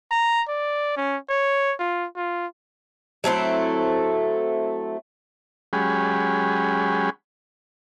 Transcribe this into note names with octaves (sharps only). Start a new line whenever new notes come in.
A#5
D5
C#4
C#5
F4
F4
F#3 A3 C4 E4
F#3 G#3 C#4 G4 G#4 B5